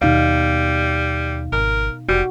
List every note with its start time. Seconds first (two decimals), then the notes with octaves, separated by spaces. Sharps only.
0.02 D#2 B2 G3 D#4 F5
1.52 G#1 A#4
2.09 F1 G3 F#4